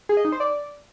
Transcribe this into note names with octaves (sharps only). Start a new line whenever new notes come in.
G#4
D#5
D#4
C5
D5